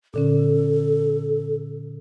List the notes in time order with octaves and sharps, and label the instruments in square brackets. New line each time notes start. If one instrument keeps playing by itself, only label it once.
[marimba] A#2 D3 C#4 [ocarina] A4